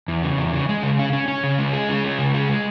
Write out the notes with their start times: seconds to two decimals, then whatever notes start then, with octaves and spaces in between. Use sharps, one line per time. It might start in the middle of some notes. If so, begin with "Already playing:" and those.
0.08 E2
0.23 C#3
0.38 E2
0.53 C#3
0.69 G#3
0.83 C#3
0.99 C#4
1.13 C#4
1.28 C#4
1.43 C#3
1.59 G#3
1.73 G#4
1.89 C#4
2.04 G#3
2.19 C#3
2.34 G#4
2.49 G#3